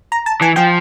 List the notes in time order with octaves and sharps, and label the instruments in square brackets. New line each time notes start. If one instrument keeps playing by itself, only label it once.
[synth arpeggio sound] A#5
A5
[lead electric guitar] E3 [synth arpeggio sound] G#5
[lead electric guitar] F3 [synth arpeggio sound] G5